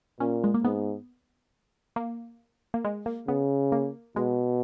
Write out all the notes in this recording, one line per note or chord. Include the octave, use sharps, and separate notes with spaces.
A#2 C#4
G#3
A#3
G#2 B3
A#3
A#3
G#3
A#3
C#3 B3
A#3
B2 G#3